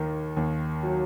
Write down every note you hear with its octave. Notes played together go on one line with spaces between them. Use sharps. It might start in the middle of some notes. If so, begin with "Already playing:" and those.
Already playing: D#2 D#3
D#2
F#3